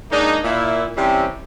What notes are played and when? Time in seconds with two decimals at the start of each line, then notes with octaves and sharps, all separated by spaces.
0.11 G#3 A#3 D4 D#4
0.44 A#2 E4
0.96 C3 E3 G3 C4 C#4